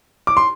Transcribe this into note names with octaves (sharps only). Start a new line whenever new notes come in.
D6
C6